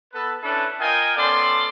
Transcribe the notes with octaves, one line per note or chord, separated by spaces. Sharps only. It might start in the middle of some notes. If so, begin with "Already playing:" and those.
B3 A4 B4
C#4 D4 E4 A4 B4
F4 A#4 D#5 G5 G#5
B3 C#4 A4 D5 C6